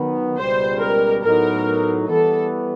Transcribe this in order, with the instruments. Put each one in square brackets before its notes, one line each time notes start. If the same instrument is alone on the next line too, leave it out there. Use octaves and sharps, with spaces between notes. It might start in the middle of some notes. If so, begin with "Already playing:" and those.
Already playing: [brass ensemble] D#3 F#3 B3
[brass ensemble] C#2 B2 G3 [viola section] C5
[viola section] A#4
[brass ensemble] A2 F#3 B3 D#4 [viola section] A#4
[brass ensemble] E3 G3 B3 [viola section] A4